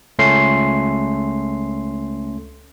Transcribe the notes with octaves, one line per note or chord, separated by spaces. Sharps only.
C#2 A3 C#4 C6 C7